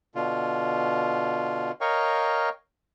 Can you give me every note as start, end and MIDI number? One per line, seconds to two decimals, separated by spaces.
0.15 1.71 47
0.15 1.71 50
0.15 1.71 65
1.81 2.49 70
1.81 2.49 73
1.81 2.49 75
1.81 2.49 77
1.81 2.49 79
1.81 2.49 85